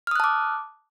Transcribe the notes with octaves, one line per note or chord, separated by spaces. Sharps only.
A5 D6 D#6 F6 F#6